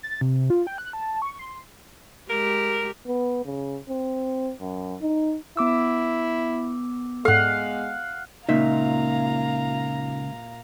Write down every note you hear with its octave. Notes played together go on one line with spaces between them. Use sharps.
A6
C3
F4
G5
F#6
A5
C#6
C6
G#3 G4 A#4
B3
C#3
C4
F#2
D#4
B3 E4 D6 E6
G#2 G#3 A4 F5 F#5
C#2 A#2 D#4 E5 F5 A#5